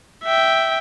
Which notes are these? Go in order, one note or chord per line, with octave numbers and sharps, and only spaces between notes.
E5 G5